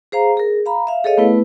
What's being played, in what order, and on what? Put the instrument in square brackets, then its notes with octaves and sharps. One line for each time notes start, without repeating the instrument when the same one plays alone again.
[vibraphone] G#4 C5 F5 A#5
G#4 A#4
F5 A#5 B5
E5 F5
G#4 A4 C#5 D#5 F5
A3 B3 E4 B4